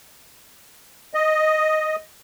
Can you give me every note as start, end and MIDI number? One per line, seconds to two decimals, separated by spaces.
1.14 1.96 75